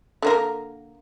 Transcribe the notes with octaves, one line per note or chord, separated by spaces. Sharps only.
D3 A#3 A#4